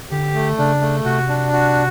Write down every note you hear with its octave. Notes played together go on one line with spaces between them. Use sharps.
D3 G4
A3
C#3 D4
A3
C3 F#4
D4
F#4